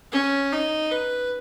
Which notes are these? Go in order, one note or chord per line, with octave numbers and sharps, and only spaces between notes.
C#4
D#4
B4